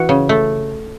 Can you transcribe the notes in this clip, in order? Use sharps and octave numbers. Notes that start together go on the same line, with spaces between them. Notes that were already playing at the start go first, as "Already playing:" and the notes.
Already playing: E3 F#4
C#3
A3